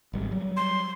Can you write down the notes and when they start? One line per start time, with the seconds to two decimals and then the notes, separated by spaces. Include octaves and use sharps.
0.13 G#1 G3
0.31 F#3 G3
0.57 C6